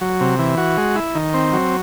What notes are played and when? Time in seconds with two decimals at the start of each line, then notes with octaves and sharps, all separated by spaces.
0.01 F#3
0.21 C3
0.39 E3
0.57 F#4
0.78 G#3
0.96 E4
1.15 D#3
1.34 C4
1.53 F#3